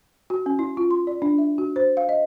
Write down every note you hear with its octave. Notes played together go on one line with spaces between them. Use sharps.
F#4
C#4
E4
F4
C6
D5
D4
E5
F#4
C5
F5
D#5